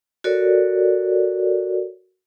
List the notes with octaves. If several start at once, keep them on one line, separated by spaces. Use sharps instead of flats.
F#4 A4 A#4 C#5 D5